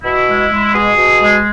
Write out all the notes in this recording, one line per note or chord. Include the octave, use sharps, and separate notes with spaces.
B2 E4
G#3
G#3
B2 G#4
B2
G#3